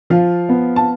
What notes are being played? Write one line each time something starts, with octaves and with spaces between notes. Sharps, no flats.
F3 F4 F5
B3
A5